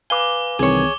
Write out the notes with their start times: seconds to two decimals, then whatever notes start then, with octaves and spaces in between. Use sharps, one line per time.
0.10 B4 F5 G#5 D6 G7
0.59 C2 D#3 E3 C4 G#4 C#5